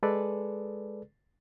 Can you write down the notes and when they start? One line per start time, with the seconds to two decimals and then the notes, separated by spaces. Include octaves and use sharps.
0.03 G#3 G#4 A4 B4 D5